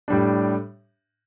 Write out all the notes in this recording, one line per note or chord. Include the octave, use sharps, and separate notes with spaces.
A2 G3 D4